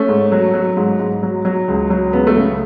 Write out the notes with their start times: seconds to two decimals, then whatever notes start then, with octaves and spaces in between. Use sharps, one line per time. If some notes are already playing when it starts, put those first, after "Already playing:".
Already playing: A3 C#4
0.08 G#2
0.32 F#3
0.54 F#3
0.77 G#2
0.99 G#2
1.23 F#3
1.45 F#3
1.68 C#2
1.90 F#3
2.13 C#2 B3
2.27 A3
2.37 C#3